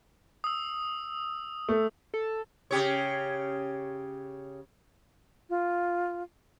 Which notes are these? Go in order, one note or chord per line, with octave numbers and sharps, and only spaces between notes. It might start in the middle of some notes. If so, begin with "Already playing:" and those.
D#6 E6
A3
A4
C#3 G4 C#5
F4